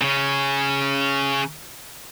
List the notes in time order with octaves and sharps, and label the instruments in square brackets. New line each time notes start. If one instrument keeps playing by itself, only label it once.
[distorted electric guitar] C#3 C#4